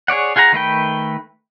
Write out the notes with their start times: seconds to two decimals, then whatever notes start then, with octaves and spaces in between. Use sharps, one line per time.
0.08 G#4 C#5 D5 F#5
0.36 F4 G#4 F#5 G5 A#5
0.53 D#3 A3 B4 G5